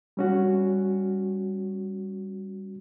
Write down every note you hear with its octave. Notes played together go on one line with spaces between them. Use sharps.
G3 C#4 F#4